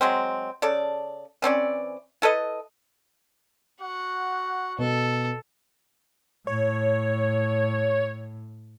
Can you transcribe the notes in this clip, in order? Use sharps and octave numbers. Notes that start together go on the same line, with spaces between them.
F#3 G#3 C4
C#3 A4 D5
E3 C4 C#4 D5
E4 A4 B4 D#5
F#4 F#5
B2 A4
A2 C#5